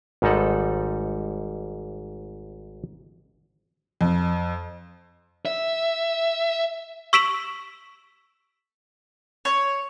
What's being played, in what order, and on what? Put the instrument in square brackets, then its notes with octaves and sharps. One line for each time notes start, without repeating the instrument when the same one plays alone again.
[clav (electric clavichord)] G#1 G#2 G3 D#4 A4 F#5
[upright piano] F2
[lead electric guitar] E5
[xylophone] C#6 E6 B6 D7 E7 F#7
[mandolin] C#5